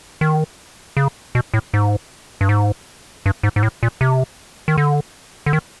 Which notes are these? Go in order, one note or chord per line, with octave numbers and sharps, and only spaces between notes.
D#3
C#3
B2
A2
G#2
G2
G#2
G2
G#2
G#2
A2
A#2
C3
D#3
D3
D3
D#3